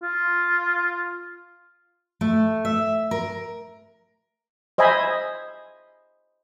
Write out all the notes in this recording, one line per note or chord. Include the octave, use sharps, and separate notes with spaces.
F4
A3
E5
A#4
C5 D#5 E5 G#5 B5